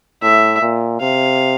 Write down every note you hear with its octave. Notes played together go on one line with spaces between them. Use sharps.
A2 E5
A#2
C3 F5